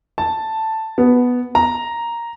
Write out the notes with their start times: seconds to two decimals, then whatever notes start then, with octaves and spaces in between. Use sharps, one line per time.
0.18 A5
0.98 B3
1.55 A#5